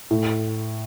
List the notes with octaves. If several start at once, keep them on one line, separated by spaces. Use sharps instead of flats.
A2